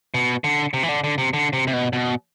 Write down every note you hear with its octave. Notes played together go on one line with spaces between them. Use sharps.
B2
D3
C3
E3
D3
D3
C3
D3
C3
C3
B2
B2